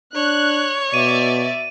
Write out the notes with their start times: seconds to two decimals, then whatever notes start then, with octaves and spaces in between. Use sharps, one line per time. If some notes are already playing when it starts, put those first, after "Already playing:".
0.15 D4 C#5 F#6
0.94 B2 D5 E5 D#7